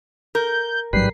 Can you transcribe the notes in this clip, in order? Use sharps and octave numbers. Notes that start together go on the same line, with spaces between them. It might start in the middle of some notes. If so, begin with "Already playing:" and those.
A#4 G6
A1 G#2 F#3 G3 B4 C7